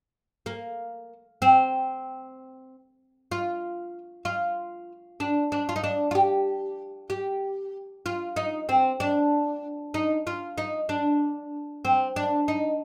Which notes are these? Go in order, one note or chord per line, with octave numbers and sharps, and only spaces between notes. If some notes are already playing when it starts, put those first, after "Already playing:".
A#3
C4
F4
F4
D4
D4
F4
D#4
D4
F4
G4
G4
F4
D#4
C4
D4
D#4
F4
D#4
D4
C4
D4
D#4